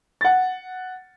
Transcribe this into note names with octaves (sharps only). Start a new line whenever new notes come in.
F#5 A6